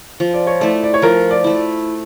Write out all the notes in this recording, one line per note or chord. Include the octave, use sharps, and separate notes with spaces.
F3
D5
C#5
A3 E4 D5
D5
C#5
F3 A#4
D5
A3 E4